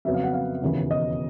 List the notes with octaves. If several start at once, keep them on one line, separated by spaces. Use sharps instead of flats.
F2 C#3 F#3 B3 E5
F5
F#5
F5
E1 D#2 C#3 E3
D#5